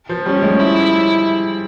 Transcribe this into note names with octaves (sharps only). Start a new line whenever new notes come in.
F3
G3 C#4
G#3
E4